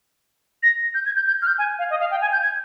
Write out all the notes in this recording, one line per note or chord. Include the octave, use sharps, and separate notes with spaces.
A#6
G6
G#6
G6
G6
F6
G6
G#5
F5
D#5
F5
G5
G#5
G6
G#6